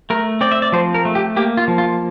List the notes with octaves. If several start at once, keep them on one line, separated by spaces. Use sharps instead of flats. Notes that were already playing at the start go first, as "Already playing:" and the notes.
A3 A#4
C4 D5
E5
D5
F3 C5
A#4
A3
G4
A#3 G4
F4
F3
F4